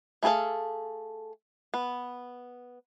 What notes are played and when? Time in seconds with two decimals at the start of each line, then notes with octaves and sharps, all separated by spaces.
0.23 A3 E4 G#4 A4 F5
1.74 B3